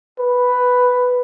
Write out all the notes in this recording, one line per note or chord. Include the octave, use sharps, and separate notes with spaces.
B4